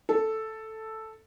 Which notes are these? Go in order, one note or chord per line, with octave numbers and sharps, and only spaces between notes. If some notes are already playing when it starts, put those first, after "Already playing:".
A4